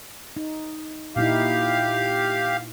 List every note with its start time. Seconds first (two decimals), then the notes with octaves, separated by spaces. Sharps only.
0.37 D#4
1.16 A#2 D#4 E4 G4 F5